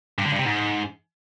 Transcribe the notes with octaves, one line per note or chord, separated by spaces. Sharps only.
G2
D3
G2
C3
G#2